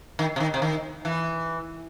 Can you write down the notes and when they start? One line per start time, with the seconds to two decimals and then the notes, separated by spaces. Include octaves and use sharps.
0.19 D#3
0.36 C3
0.40 D#3
0.54 C3
0.62 D#3
1.05 E3